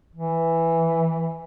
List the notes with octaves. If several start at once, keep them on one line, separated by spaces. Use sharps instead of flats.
E3